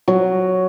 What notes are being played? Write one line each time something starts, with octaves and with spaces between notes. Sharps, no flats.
F#3